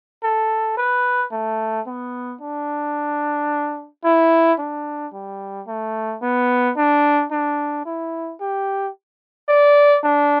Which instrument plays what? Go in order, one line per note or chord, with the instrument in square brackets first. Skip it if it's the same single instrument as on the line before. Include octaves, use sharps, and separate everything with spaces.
[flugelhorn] A4
B4
A3
B3
D4
E4
D4
G3
A3
B3
D4
D4
E4
G4
D5
D4